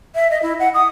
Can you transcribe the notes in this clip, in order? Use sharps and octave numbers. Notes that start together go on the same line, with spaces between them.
E5
D#5
E4
F#5
D#6